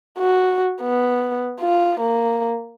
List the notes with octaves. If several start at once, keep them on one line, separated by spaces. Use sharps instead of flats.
F#4
B3
F4
A#3